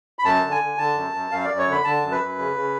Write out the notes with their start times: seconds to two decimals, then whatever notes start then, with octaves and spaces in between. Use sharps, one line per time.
0.19 B5
0.24 F#2 A5
0.42 D3
0.51 G#5
0.60 D3
0.78 D3 A5
0.95 F#2
1.13 F#2
1.31 F#2 F5
1.45 F#2 D5
1.58 C#5
1.66 D3
1.72 B5
1.85 D3 A5
2.02 F#2
2.11 B4
2.20 F#2
2.39 C#3
2.56 C#3